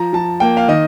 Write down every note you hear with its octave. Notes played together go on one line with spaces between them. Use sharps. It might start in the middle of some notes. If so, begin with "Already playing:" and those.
Already playing: F3 A#5
F3 A5
A#3 G5
F5
D#3 D#5